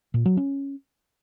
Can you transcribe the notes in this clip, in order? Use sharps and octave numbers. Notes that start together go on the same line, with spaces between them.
A#2
F#3
C#4